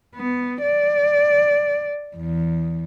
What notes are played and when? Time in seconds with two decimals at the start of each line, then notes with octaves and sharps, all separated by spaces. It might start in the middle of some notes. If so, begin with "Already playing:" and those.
0.15 B3
0.62 D5
2.16 E2